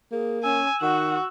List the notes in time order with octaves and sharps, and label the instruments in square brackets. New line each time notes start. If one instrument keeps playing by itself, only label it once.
[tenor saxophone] A#3 [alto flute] G#4
[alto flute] C#4 [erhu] G#5 [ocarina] E6
[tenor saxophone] D#3 [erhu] F#4 [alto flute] F#5